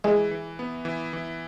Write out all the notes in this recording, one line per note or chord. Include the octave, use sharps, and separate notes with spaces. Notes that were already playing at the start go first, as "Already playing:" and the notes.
E3 G#3
E3
B3
E3
E3